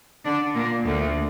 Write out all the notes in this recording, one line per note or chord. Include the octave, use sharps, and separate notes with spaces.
D3 D4
A#2 A#3
D2 D3